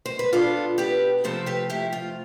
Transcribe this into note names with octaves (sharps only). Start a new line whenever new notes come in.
C5
B4
B2 B3 D4 F4 A4
G4 B4
C3 F3 A3 C4 A4 C5
G4 B4
E4 G4
F4